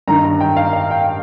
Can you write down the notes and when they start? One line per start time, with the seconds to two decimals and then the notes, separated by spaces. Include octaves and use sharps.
0.08 G2 D#3 A#5
0.24 A#5
0.41 G5
0.57 F5
0.73 F5
0.91 G5